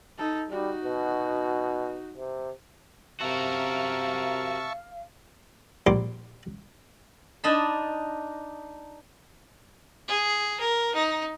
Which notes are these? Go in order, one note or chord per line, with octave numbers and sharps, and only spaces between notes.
D#4 A4
G3 D#4 F#4
B2
C3
C3 F#4 A#4 E5 F5 A5 C#6
A#1 G3 C6 D6
D4 D#4 D#5 A5 B5
G#4
A#4
D#4